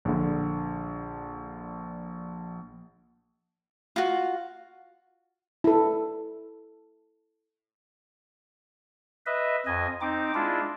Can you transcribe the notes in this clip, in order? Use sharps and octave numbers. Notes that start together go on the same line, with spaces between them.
A#1 D3
F4 F#4
E4 A4
B4 D#5 E5
F2 D#5 G#5
C4 D#4 D6
G#3 D4 E4 F4